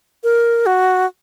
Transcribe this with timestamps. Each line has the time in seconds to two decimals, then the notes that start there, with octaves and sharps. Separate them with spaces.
0.24 A#4
0.66 F#4